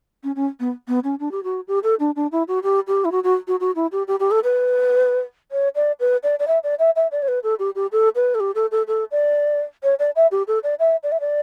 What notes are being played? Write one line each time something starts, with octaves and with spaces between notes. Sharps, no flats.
C#4
C#4
B3
B3
C#4
D4
G4
F#4
G4
A4
D4
D4
E4
F#4
G4
G4
E4
F#4
F#4
F#4
F#4
E4
G4
G4
G4
A4
B4
C#5
D5
B4
D5
D5
E5
D5
E5
E5
D5
C#5
B4
A4
G4
G4
A4
B4
A4
G4
A4
A4
A4
D5
C#5
D5
E5
G4
A4
D5
E5
D5
E5
D5